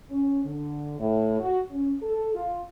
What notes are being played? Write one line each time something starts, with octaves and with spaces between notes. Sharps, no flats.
C#4
D3
A2
F#4
C#4
A4
F4